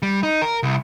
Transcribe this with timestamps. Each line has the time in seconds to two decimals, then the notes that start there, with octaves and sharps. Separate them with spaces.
0.02 G3
0.23 D#4
0.42 A#4
0.63 C2